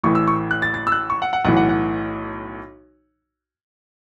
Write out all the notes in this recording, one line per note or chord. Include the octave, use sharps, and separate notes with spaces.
A1 A2 E3 C#6
E6
C#6
F#6
A6
A6
E6
F#6
C#6
F#5
F#5
B1 A2 E3 F#5
F#5
F#5